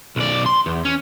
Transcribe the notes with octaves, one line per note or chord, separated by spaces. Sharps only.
B1 D5
C6
E2
C#4